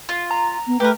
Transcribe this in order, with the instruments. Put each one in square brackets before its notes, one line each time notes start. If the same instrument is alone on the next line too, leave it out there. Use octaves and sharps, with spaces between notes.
[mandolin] F4
[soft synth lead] A#5
[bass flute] B3
[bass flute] A3 [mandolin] G4 A#4 [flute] B4